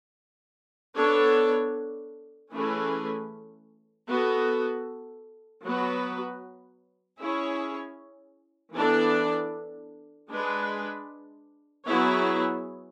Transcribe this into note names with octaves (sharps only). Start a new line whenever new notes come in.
B3 D4 A4 C#5
E3 A3 C#4 G#4 B4
B3 F#4 A4
F#3 B3 F#4 B4
C#4 E4 G#4 C#5
E3 B3 D4 A4 D5
G#3 D4 G#4 B4
F#3 B3 E4 G#4 C#5